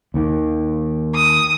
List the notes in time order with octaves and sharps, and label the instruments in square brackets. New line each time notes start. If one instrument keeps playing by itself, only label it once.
[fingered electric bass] D#2 D#3
[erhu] D#6